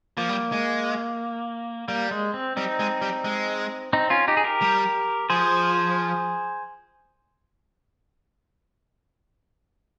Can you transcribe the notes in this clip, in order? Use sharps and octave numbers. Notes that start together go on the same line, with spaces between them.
F3 A#3
G3
G#3
G3 A#3
G#3
C4
G3 C4 D#4
G#3
G3
G#3
C4 D#4
C#4 F4
D#4 G4
G#4
G4 A#4
G3
F3 G#4 C5